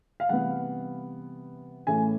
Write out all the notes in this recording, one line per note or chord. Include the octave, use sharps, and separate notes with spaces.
F5
C3 E3 G3 B3 F#5
A2 E3 A3 C#4 G#5